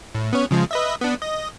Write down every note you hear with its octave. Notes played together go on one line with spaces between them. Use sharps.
A2
B3 C#4 C#5
C#3 F3 G#3
B4 D#5 E5
B3 D4
D#5